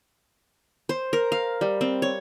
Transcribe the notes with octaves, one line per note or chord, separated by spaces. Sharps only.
C5
A#4
F5
G3
C4
C#5